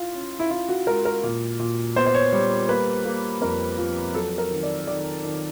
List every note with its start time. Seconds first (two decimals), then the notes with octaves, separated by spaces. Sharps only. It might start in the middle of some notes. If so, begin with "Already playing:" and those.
Already playing: E4 F4
0.15 C#4
0.40 E4
0.51 E4 F4
0.69 F#4
0.87 G#3 A#4
1.05 A#4
1.23 A#2
1.59 A#2
1.96 B3 C5
2.06 C5
2.14 C#5
2.33 G3 C#5
2.69 A#3 B4
3.05 A#3
3.41 F2 A#4
3.78 F3
4.15 F#3 A4
4.38 A#4
4.51 D#3
4.63 D5
4.87 D#3 D5
5.23 D#3